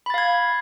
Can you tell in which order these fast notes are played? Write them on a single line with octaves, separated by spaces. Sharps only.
B5 A6 F5 G#6